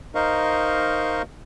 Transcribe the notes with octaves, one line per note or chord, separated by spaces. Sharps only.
D#4 A#4 C5 D#5 F5 C#6